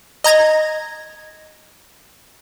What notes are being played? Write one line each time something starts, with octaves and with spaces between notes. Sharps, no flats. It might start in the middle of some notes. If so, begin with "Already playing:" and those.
D#5 A#5 G#6 A#6